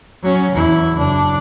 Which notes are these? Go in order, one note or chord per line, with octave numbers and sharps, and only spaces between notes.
F#3 C#4
E2 E4
F#1 D4